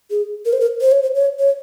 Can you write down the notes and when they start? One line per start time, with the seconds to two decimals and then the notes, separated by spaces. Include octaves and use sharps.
0.11 G#4
0.45 A#4
0.53 C5
0.60 A#4
0.81 C5
0.92 C#5
1.03 C5
1.15 C#5
1.39 C#5